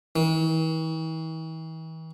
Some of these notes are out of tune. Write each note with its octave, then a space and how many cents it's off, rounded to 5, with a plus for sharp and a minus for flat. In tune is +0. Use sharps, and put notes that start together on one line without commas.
E3 -45